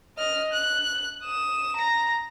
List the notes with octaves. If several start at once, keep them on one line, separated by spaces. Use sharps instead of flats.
D#5 F6
F#6
D#6 E7
A#5 A#6